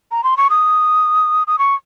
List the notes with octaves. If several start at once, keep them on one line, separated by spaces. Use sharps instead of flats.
A#5
C6
C#6
D#6
D#6
C#6